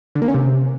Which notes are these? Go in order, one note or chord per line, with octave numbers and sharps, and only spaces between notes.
D3
A#3
C#4
C3